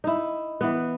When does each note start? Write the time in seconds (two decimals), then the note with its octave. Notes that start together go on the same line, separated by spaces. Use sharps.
0.04 D#4 E4
0.61 E3 B3